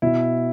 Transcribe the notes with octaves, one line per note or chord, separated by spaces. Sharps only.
B2 E4